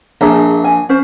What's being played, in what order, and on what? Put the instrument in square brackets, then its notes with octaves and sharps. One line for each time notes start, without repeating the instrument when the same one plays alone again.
[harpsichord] A#1 [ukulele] G#4 E5 A#5
[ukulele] G#5
C#4 C5